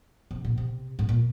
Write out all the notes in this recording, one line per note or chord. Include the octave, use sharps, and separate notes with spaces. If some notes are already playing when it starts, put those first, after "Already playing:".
C3
A#2
C3
G#2
A#2